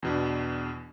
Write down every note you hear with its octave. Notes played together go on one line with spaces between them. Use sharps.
E2 B2 D4